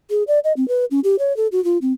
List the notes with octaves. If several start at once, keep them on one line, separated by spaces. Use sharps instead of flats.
G#4
D5
D#5
C4
B4
C#4
G4
C#5
A4
F#4
F4
C4